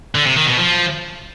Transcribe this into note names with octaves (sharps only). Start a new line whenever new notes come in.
D3
C3
D#3
B2
F3